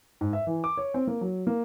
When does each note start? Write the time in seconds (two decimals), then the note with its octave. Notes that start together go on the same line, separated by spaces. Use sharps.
0.21 G#2
0.33 E5
0.47 E3
0.64 D6
0.77 C#5
0.94 C4
1.07 A#3
1.21 F#3
1.47 A#3